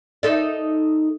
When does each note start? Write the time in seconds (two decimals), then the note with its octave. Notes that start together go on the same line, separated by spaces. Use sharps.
0.23 D#4 A4 D5